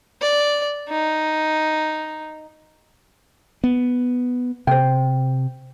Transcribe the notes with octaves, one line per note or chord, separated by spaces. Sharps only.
D5
D#4
B3
C3 C5 G5